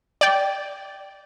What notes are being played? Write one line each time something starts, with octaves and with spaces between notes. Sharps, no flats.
D5 G5